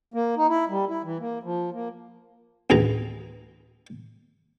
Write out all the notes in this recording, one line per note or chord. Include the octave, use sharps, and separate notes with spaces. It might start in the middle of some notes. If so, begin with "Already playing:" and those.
A#3
D#4
E4
G3
E4
E3
A#3
F3
A#3
A1 D2 G#4 B4 A#5